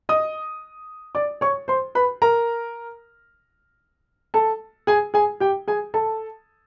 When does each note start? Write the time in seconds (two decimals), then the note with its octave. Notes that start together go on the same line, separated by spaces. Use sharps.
0.09 D#5 D#6
1.15 D5 D6
1.41 C#5 C#6
1.68 C5 C6
1.95 B4 B5
2.22 A#4 A#5
4.34 A4 A5
4.87 G#4 G#5
5.14 G#4 G#5
5.40 G4 G5
5.68 G#4 G#5
5.94 A4 A5